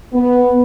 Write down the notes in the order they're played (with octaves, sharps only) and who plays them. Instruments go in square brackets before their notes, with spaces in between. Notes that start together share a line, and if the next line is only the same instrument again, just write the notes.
[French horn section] B3